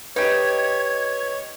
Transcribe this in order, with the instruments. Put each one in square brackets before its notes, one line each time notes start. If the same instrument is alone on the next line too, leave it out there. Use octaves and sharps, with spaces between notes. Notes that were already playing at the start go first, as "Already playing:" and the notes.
[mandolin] D#4 G4 [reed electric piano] B4 [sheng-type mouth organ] C#5 [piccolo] G#6